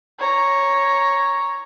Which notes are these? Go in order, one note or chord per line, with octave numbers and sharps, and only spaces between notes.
C#5 A#5